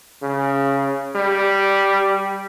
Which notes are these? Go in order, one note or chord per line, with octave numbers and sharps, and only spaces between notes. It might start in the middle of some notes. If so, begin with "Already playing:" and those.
C#3
G3